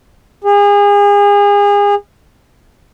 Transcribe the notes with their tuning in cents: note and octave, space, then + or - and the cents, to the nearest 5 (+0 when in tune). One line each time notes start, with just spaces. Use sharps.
G#4 -35